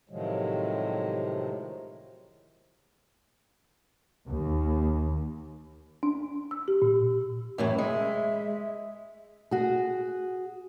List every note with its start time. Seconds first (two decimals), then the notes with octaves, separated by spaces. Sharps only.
0.09 A2 C3 D#3 F3 F#3 G#3
4.26 D#2
6.03 D4
6.51 E6
6.68 G4
6.82 A#2
7.58 F#2 A2 E3
7.78 G#3 E5
9.51 F#4 G#4